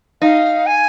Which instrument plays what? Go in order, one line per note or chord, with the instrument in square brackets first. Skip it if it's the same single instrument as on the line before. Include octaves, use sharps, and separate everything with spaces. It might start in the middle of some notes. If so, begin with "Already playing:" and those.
[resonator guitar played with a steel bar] D#4 [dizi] F5
[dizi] G#5